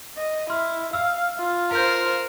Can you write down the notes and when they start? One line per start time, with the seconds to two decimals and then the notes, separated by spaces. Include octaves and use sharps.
0.17 D#5
0.50 E4 C6 F6
0.93 F5 E6 F6
1.38 F4
1.71 A#4 C5 F5 F6 G6